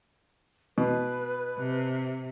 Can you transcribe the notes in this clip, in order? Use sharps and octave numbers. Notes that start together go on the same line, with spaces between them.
B2 B4
C3